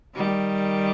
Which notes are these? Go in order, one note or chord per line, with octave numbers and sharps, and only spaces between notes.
D#3 G3